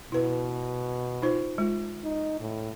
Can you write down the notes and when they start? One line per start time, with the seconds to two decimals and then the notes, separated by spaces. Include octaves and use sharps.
0.12 B2 E4 B4
1.22 D#4 F4 C5
1.58 G#3 F4
2.04 D#4
2.41 A2